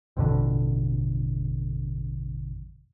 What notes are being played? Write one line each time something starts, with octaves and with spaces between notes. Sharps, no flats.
A1 F2 B2 D3